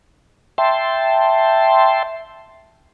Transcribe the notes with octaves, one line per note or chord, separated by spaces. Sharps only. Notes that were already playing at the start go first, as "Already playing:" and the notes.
E5 G5 A5 C6